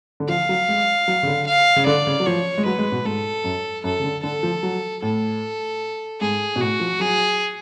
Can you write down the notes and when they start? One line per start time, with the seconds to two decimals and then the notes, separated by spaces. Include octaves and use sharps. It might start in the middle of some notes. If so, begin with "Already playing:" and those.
0.20 D3
0.29 F3 F5
0.49 F#3
0.68 G#3
1.08 F#3
1.23 C#3
1.27 D3
1.48 F5
1.76 C#3
1.87 D3 D5
2.07 C#3
2.20 F#3
2.26 F3 C#5
2.58 G#3
2.66 F#3 B4
2.79 G#3
2.92 B2
3.05 G#2 A4
3.44 F#2
3.84 F#2 A4
3.99 C#3
4.04 D3
4.23 D3 A4
4.43 F3
4.63 F#3
5.02 A2 A4
6.21 G#2 G#4
6.56 B2
6.61 A2 F#4
6.80 F3
7.00 F#3 G#4